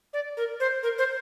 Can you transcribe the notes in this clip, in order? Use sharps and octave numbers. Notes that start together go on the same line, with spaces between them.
D5
A#4
C5
A#4
C5